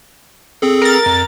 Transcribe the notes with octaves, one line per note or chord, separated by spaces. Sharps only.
C4 G#4 A4
A#4 A6
F2